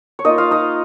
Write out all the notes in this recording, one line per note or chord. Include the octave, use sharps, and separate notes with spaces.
C#5
A#3 D#4 F4 D#5
F4 F5
D#4 D#5